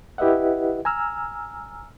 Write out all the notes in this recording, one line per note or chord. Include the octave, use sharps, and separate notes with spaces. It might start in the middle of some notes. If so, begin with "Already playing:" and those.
E4 G4 B4 D#5 E5 F#5
G#5 A#5 E6 F6